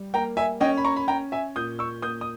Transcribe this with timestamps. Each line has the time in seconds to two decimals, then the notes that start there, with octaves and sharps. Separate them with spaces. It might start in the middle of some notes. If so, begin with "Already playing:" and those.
Already playing: G3
0.14 A#3 G5 A#5
0.37 E5 G#5
0.60 C#4 D#5 G5
0.77 B5
0.85 A#5 C#6
0.96 B5
1.08 C#4 G5 A#5
1.32 E5 G#5
1.56 A#2 D#6 G6
1.79 C#6 E6
2.02 A#3 D#6 G6
2.21 D#6